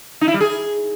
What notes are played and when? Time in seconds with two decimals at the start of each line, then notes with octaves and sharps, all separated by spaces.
0.21 D#4
0.28 E4
0.34 G3
0.40 G#4